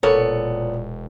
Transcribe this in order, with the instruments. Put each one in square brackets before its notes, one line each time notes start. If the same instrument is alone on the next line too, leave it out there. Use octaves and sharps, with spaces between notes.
[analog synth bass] E1 [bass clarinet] A#2 [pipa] A#3 B3 C#5 [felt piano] A4